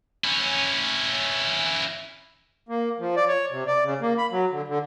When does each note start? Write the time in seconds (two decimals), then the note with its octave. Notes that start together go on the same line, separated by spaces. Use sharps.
0.24 C#4 E4
2.69 A#3
2.99 F3
3.17 D5
3.28 C#5
3.51 C3
3.67 D5
3.84 C#3
4.01 A#3
4.18 B5
4.32 F#3
4.51 D3
4.68 D3